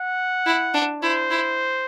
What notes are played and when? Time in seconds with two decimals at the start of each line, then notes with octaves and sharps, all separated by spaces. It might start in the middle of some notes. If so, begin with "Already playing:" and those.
Already playing: F#5
0.46 E4
0.74 D4
1.02 E4 C5
1.30 E4